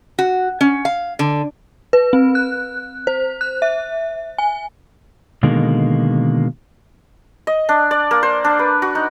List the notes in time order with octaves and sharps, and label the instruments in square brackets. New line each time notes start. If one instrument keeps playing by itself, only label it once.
[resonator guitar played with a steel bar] F#4
C#4
F5
D3
[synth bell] B4
C4
F#6
C5
F#6
E5
G#5
[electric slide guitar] B2 D3 D#3 G#3 A#3
[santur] D#5
D4
D5
A#3
C5
D4
B4
F#4
D#4